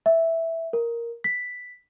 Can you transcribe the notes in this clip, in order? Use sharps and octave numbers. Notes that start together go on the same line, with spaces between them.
E5
A#4
B6